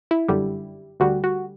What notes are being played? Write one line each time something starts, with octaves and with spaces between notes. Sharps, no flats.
E4
G1 F#2 D3 G3
D2 D3 G3 F#4
F#4